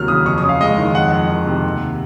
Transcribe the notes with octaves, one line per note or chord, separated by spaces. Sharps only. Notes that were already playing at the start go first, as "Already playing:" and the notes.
Already playing: D#2 C3 F#3 A#3 F6
C#3 D#6
F2 C#6
D#6
C#4
F5
G#3 D#5
D#3
F2 F#5
F2
D#3
C3
D#2